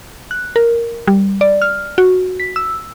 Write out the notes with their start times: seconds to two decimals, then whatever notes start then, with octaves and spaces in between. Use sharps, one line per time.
0.31 F#6
0.56 A#4
1.07 G3
1.41 D5
1.62 F6
1.98 F#4
2.40 B6
2.56 E6